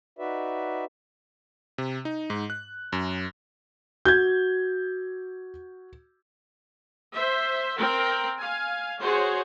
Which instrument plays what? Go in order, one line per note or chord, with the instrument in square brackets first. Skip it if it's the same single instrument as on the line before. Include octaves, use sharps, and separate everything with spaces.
[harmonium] D#4 F#4 B4 D5 E5
[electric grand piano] C3
D#4
G#2
F#6
F#2
[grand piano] F#4 [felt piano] G6 G#6
[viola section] C5 E5
C4 A#4 G5
F5 G#5
F#4 G#4 C5 C#5